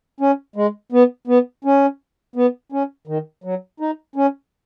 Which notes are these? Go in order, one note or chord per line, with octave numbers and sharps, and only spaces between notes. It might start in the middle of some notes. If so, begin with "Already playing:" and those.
C#4
G#3
B3
B3
C#4
B3
C#4
D#3
F#3
D#4
C#4